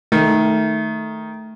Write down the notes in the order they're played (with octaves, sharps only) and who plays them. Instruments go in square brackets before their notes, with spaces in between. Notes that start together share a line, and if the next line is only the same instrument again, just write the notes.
[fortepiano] D#3 [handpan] A3